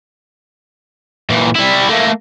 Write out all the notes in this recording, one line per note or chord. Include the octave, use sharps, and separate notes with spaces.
A#2 E3
G3 E4
A3 A#3